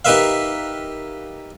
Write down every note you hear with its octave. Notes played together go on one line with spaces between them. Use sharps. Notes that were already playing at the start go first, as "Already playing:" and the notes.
D#4 G4 A#4 B4 E5 F5